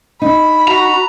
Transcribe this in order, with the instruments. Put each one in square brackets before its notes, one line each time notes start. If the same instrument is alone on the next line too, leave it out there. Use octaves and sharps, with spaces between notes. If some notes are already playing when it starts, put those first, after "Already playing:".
[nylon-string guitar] D#4 [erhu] B5
[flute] F#4 [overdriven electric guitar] A#5